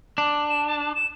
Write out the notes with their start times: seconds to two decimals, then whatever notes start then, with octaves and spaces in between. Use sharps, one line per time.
0.18 D4
0.50 E7
0.66 A5
0.80 A5
0.95 E7